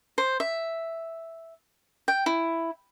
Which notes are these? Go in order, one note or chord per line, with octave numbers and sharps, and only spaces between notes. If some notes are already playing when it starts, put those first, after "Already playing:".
C5
E5
G5
E4